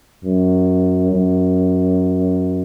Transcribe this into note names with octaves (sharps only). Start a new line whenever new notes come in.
F#2
F#2